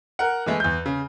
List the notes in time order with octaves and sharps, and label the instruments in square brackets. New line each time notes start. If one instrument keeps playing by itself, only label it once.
[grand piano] A#4 F#5
E3 G#3 A3
E2 G6
C#3